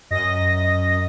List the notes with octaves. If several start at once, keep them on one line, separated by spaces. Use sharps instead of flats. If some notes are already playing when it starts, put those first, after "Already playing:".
F#2 D#5 A#6